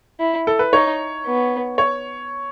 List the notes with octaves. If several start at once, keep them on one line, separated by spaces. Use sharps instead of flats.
E4
A4
B4
D#4 C#5
B3
C#5